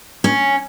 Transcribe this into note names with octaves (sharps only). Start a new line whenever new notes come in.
C#4